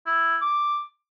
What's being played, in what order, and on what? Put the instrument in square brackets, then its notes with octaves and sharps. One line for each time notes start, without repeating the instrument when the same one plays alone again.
[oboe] E4
D6